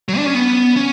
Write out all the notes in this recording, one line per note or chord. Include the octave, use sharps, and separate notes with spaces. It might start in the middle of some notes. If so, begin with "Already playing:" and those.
F#3
D4
C#4
B3
C#4